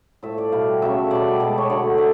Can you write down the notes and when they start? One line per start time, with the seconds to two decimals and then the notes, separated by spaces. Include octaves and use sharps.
0.23 A2 F3 A3 E5
0.38 D5
0.52 B2 G3 F5
0.82 C#3 F#3 A3 E5
1.11 B2 G3 D5
1.40 B2 G#3 D5
1.58 C#5
1.70 D3 F#3 A3 D5
1.98 D5